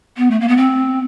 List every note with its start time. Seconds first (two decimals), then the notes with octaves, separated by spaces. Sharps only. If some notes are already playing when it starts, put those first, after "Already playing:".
0.17 B3
0.31 A3
0.41 A#3
0.48 B3
0.57 C4